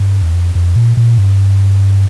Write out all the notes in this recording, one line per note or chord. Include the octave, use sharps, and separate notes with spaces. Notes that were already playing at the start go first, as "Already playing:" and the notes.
Already playing: G2
E2
F2
F2
A#2
A#2
G2